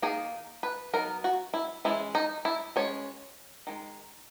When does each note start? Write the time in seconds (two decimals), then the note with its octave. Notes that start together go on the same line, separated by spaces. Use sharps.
0.02 D#3 A#3 D#4 G#4
0.63 B4
0.93 F#3 B3 D#4 A#4
1.24 F#4
1.54 E4
1.85 E3 G#3 C#4 E4
2.15 D#4
2.45 E4
2.76 G#3 C#4 C#5
3.67 D#3 G#3